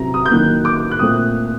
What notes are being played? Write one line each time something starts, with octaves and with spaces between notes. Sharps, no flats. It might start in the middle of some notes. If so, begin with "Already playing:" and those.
Already playing: C3 F#3 C4 A#5
D#6
G6
D#3 F#3 A#3 F#6
D6
F#6
A#2 A3 C4 D#6